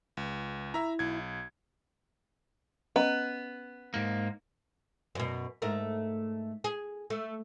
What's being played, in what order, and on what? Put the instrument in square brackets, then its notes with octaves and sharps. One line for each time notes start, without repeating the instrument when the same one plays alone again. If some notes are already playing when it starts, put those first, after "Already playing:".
[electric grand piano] C#2
[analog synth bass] E4 [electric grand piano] E5 A#5
[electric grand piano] B1 G#6
[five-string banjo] B3 [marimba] C#4 D#5 A#5
[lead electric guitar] G#2 A#3
[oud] F#2 B2
G#2 A3 A#4
G#4
A3